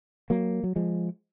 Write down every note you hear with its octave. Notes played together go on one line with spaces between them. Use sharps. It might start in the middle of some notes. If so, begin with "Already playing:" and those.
F#3 A#3
F#3
F3 G#3